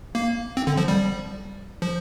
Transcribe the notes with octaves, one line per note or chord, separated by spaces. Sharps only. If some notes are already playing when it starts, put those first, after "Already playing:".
A#3
C4
D3
F3
G3
F3